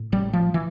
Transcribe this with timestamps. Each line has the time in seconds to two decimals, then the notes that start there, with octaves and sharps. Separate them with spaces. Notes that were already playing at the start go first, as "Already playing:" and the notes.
Already playing: A2
0.12 A1 G3
0.33 F3
0.54 E3